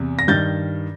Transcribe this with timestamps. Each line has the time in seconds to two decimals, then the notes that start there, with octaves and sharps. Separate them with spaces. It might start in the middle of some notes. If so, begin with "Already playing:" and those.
Already playing: E2 C3
0.19 A#6
0.28 G2 D#3 G3 G6 A6